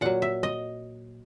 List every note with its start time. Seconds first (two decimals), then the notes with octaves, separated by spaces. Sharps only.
0.01 A#2 F#3 F#5
0.22 E5
0.43 D#5